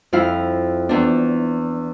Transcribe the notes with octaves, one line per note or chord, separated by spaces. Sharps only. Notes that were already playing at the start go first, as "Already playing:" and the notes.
F2 E4 F5
E2 D4